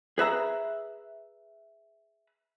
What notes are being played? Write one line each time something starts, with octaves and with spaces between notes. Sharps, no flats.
G#4 B4 E5 A#5